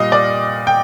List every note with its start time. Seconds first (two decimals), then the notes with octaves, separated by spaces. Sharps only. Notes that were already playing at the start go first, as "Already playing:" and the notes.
Already playing: A#2 G3 D#5 F5
0.12 D5
0.67 G5